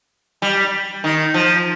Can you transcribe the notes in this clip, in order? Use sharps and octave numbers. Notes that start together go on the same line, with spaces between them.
G3
D#3
F3